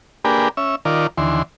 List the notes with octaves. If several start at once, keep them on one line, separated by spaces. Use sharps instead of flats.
A#3 D4 G4 G#4 A#4 B4
C#4 E5
D#3 F4 A#4 D5
D#2 D3 E3 C6